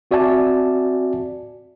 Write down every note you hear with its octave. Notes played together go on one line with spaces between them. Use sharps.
C4 F#4 D5 E5 G#5 A5